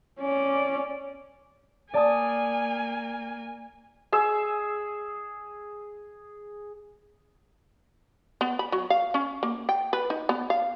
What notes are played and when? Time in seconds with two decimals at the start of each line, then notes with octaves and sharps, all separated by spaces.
0.20 C#4 D5
1.94 A#3 D5 G#5 A5 D#6
4.12 G#4 E6
8.41 B3
8.59 B5
8.72 F#3
8.90 F5
9.14 C#4
9.43 A#3
9.69 G5
9.93 B4
10.10 D#4
10.29 B3
10.50 F5